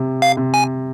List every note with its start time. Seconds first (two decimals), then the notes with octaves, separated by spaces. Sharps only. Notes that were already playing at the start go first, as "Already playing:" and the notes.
Already playing: C3
0.22 F5
0.37 C3
0.54 G#5